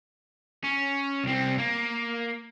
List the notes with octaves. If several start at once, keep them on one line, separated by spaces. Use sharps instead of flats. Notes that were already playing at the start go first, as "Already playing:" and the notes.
C#4
C2 C4
A#3